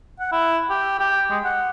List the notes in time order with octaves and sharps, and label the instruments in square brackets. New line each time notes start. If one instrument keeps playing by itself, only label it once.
[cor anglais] F#5
E4
G4
G4
G#3
F#5